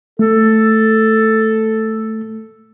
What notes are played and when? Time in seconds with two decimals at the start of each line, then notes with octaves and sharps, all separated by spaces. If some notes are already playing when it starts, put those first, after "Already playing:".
0.19 A3 A4